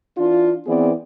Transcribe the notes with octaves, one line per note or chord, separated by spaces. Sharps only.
E3 D4 F4
E3 B3 C4 G#4 D5